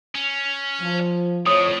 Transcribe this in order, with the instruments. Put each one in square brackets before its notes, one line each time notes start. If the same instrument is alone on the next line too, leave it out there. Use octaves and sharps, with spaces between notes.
[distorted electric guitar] C#4
[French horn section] F3
[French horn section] F2 C#5 [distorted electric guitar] A2 [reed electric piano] D#6